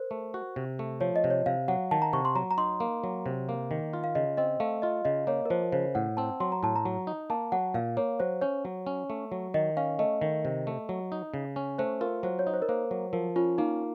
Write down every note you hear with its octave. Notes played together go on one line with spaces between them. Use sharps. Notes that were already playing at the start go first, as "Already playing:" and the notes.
Already playing: A#4 C5
A3
F#4
C3
A3
F3 C#5
D#5
C3
C#5
C3 F5
F#3 F#5
D#3 A5
A#5
C3 C#6
C6
F#3 A#5
A#5
D#4 C6
A#3
F#3
C3
A#3
D#3
F4
F5
C#3 D#5
C4 D#5
A3 F5
F4 D#5
C#3 D#5
A#3 C#5
A#4
F3 C5
C#3 C5
A2 F#5
C4 A5
F#3 C6
A#5
A2 A5
A#5
F#3
D#4
A#3 A5
F#3 F#5
A#2 F5
A#3 C#5
F#3 C5
C#4 C#5
F#3
C#4
A3
F#3
D#3 D#5
C#4 F5
A3 D#5
D#3
C3
A3
F#3
D#4
C#3
C#4
A3 C5
F4 A#4
F#3 C5
C#5
D#4
C5
A#4
A#3 C5
F#3
F3 A#4
C#4 F4
A#3 D#4